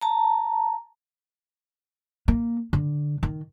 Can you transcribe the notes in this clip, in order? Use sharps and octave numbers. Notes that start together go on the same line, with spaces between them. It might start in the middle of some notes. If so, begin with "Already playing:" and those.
A5 A#5
A#3
D3
D#3